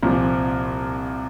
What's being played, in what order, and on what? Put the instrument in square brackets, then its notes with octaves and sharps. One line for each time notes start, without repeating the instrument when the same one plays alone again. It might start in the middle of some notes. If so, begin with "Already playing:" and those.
[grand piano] C2 A#2 F3